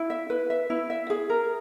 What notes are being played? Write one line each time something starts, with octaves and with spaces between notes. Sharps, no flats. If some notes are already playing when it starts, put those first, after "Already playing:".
Already playing: E4
E5
B4
E5
E4
E5
G#4
A#4